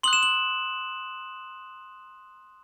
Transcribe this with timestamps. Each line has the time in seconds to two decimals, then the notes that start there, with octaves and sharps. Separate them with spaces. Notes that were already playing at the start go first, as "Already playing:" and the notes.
0.03 C6 D#6 F#6 F#7
0.13 E7
0.23 F#7